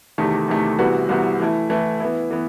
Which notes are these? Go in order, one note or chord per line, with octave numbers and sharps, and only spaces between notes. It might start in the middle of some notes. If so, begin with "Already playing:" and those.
E2 C3 D#3 A3
E2 C3 D#3 A3
C2 C3 E3 B3 F#4
C2 C3 E3 B3 F#4
E3 A3 E4
E3 A3 E4
E3 B3 E4
E3 B3